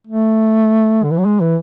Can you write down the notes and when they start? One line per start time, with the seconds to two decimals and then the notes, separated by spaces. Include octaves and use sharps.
0.07 A3
1.04 D3
1.11 E3
1.18 F#3
1.25 G#3
1.40 E3